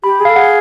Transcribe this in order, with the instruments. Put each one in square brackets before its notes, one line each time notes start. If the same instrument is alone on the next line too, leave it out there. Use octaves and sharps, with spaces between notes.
[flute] G4 [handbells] B5
[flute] G#4
[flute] A4 [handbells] F5
[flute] G#4 [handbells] F#5